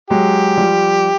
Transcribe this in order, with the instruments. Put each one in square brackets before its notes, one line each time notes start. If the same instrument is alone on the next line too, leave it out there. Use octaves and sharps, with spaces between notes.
[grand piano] F#3 G#3 [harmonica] G4
[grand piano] F3 G3